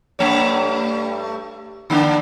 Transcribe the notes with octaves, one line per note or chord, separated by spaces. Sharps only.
G2 A3 C#5
D3 A#3 D4